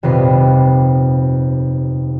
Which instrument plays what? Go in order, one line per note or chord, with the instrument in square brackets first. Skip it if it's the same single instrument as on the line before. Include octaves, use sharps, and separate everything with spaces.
[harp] D#1 F2 C3 B4 B5 C7